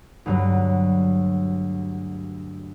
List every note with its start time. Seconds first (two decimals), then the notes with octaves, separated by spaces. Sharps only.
0.26 D2 G2 F#3